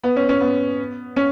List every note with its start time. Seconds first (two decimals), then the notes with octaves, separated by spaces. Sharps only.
0.04 B3
0.16 C#4
0.29 C#4
0.41 B3
1.16 C#4